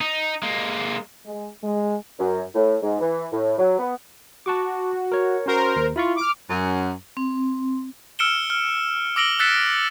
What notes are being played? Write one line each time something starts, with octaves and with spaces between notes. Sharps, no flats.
D#4
G#3 A#3
G#3
G#3
F#2
A2
G#2
E3
A2
F#3
B3
F#4 A5 C#6 D6
A#4 C#5
C#4 F#4 A#4 C5
D#2
E4 F4 B5 C#6
D6 F6
F#2
C4
E6 F6 C#7 D7 E7 G7
F6
D6 E6 A#6 D7 F#7 G7
E6 F#6 A6 B6 C#7 E7